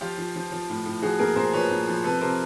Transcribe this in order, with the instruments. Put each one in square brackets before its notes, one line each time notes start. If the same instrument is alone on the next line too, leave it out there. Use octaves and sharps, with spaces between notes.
[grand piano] F3 F4 G4
F3
F3
F3
A2
A2
F3 F#4 G#4
A#2 G#4 A#4
A#2 A#4 C5
F3 B4 C#5
A#2
F3
C3 A4 B4
C3 A#4 C5